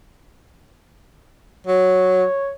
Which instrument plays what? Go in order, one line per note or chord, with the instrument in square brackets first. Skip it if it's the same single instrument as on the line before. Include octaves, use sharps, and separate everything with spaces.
[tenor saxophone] F#3 [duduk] C#5